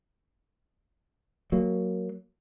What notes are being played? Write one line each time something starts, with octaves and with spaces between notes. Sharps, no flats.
F#3 A#3